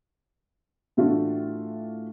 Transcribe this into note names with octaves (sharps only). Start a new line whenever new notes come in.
A2 E3 A3 D4 F4 F#4